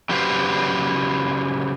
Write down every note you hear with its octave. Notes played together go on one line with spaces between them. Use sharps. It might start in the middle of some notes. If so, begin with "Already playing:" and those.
C#3 F#3 G4 B4 C5 F5